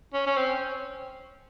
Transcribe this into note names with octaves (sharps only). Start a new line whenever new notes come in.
C#4
C#4
C4